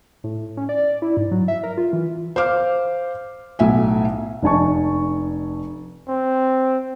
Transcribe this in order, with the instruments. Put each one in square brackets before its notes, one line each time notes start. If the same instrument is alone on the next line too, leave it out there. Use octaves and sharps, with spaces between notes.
[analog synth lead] A2
C#4
D5
E4
G#2
F#3
E5
A#4
F4
E3
[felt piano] C5 F5 D6 F6
B1 A2 E5 G#5
[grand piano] F1 D4 D#5 G#5 A5 C#6
[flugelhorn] C4